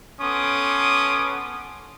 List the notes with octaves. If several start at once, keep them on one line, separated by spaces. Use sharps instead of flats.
B3 C#4 A4 C6 D6 D#6